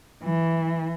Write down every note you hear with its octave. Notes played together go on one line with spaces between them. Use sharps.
E3